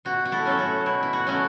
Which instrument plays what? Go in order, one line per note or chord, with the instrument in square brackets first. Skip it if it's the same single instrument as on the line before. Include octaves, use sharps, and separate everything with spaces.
[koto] B2 F#4
F#4
E4 A4
F#3 A3 C#4 A4
F#4
B2 E4
E4
F#4
F#3 A3 C#4 F#4